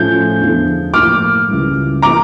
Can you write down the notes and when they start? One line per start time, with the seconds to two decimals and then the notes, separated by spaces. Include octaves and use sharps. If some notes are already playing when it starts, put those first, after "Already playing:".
Already playing: A2 F3 A3 C#4 F4 G6
0.40 E2 D3 F3
0.94 A2 F3 A#3 D6 F6
1.48 C#2 C#3 E3 G3
2.02 F3 A#3 A#5 D6